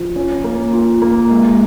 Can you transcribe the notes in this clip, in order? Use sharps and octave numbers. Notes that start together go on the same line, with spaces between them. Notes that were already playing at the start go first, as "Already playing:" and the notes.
Already playing: F3
C#4
A#3
F4
A#3
G#3